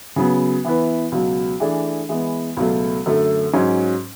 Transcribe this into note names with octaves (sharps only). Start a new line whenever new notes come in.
C#3 F#3 B3
E3 B3 E4 B4
C#2 B2 F#3
E3 A3 D4 G#4
E3 G#3 B3
C#2 B2 F#3 A3
F#2 D3 A3
G#2 F#3 C#4